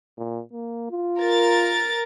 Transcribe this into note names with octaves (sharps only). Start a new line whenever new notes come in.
A#2
A#3
F4
A#4 A6